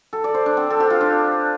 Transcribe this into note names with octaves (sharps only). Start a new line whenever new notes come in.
A4
D5
C5
D4
C4
A4
G4
F4
D4